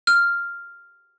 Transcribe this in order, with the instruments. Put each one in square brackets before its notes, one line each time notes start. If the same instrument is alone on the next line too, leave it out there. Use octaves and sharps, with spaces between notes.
[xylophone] F6